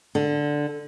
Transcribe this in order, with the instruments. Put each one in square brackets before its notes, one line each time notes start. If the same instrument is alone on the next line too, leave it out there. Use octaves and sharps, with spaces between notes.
[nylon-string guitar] D3